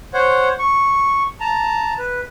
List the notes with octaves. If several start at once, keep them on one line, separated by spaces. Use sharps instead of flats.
C5 C#5 F#5
C#6
A5 A#5
B4